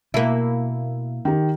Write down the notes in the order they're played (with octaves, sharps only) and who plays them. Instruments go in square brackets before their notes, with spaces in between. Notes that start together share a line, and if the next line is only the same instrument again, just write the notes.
[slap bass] B2 [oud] A#3 E4
[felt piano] D#3 G4